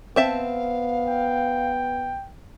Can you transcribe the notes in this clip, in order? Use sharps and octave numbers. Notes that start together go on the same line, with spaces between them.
B3 C4 E5 F5 A5
G5